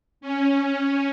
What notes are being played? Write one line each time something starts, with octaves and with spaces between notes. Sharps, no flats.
C#4